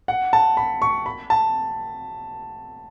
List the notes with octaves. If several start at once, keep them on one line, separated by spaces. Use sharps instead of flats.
F#5
A5
B5
C#6
B5
A5